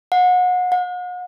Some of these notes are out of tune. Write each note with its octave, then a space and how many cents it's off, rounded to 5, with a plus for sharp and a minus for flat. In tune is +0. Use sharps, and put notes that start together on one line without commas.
F#5 -30
F#5 -45